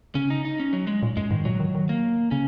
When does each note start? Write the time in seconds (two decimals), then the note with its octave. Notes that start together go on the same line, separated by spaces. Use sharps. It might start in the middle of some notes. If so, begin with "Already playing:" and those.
0.15 C#3 C#4
0.30 D#4
0.45 D#4
0.60 C#4
0.73 F#3
0.87 G#3
1.03 A#2
1.17 F#2 G#3
1.31 G#2 D#3
1.45 A#2 F#3
1.60 D#3
1.75 D#3
1.89 A#3
2.31 C#3 C#4